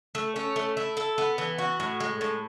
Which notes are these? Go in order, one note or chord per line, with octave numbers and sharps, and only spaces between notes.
A3
C#4
A3
E4
A4
B3
E3
F#4
A2
G#3
A2